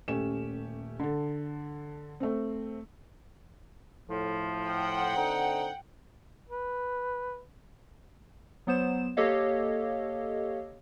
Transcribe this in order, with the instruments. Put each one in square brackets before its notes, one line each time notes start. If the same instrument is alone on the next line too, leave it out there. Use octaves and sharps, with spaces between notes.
[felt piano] D#1 A3 C#4 G4 E7
D3 A4
A3 C4
[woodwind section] A2 F3
[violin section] F#5 G5
[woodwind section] D3 C4 D#4
[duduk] B4
[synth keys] F#3 B3 C5 E7
A#3 G4 A4 C#5 D#5 F5